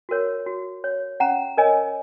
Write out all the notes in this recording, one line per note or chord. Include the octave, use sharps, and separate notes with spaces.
F#4 A#4 C#5
F#4
C#5
C#4 F#5 A#5
A#4 C#5 D#5 G#5